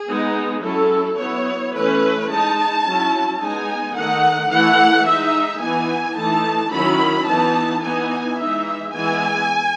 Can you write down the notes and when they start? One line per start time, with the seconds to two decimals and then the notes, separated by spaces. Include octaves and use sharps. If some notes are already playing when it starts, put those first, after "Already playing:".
Already playing: G#4
0.09 G#3 B3 D#4
0.64 F#3 C#4 E4 A4
1.19 F#3 B3 E4 C#5
1.75 E3 A3 C#4 E4 B4
2.30 G#3 D#4 A5
2.86 F#3 C#4 E4
3.41 G#3 B3 D#4 G#5
3.96 D#3 A3 D#4 F#5
4.51 E3 A3 E4 F#5
5.07 G#3 D#4 E5
5.62 E3 B3 D#4 G#5
6.17 E3 A3 D#4 A5
6.73 D#3 F#3 C#4 E4 B5
7.28 E3 B3 D#4 A5
7.83 E3 B3 D#4 G#5
8.38 E3 G#3 D#4 E5
8.93 E3 G#3 B3 G#5